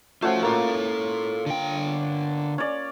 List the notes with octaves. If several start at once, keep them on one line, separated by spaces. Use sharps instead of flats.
A3 C#4 F4 F#4 C5
A#3 F4 A4 C#5
D3 G5
C#4 D5